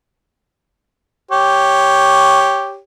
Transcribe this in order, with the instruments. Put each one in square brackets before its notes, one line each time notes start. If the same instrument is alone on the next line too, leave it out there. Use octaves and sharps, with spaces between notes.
[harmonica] G4 C#5